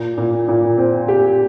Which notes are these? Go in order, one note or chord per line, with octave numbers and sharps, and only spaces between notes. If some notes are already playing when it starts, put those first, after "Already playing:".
Already playing: A#2
A#2
A#2
C4
G4